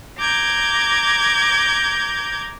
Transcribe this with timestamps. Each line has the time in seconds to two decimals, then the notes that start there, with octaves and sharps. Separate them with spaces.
0.18 A#5 D6 G6 G#6